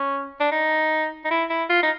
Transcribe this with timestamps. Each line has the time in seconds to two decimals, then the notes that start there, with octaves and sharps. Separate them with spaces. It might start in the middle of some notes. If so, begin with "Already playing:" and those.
Already playing: C#4
0.40 D4
0.51 D#4
1.25 D#4
1.31 E4
1.50 E4
1.69 F4
1.83 D#4